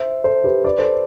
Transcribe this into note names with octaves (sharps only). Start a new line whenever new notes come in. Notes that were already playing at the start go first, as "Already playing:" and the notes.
Already playing: C5 E5
A4 C5
G4 B4
B4 D5
A4 C5